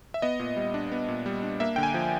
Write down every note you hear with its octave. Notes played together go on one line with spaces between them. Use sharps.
E5
B3 D#5
A#2
G3
D4
B3
A#2
G3
D4
A#3 E5
D3 G5
G#5
F3